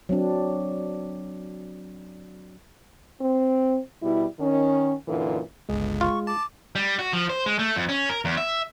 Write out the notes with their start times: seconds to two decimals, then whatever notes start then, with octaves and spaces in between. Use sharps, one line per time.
0.09 F#3 C4 D4
3.21 C4
4.02 B2 G3 E4
4.40 D#3 C#4
5.07 F#2 A#2 D3 E3
5.69 G1 C#2 G#3 G#4
6.01 F4 C#6
6.27 A5 D6
6.75 G3
6.99 F#4
7.13 F3
7.30 C5
7.46 G#3
7.59 A3
7.76 F2
7.89 C#4
8.09 A#4
8.25 E2
8.37 E5